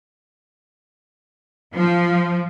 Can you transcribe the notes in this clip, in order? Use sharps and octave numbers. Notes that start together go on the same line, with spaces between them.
F3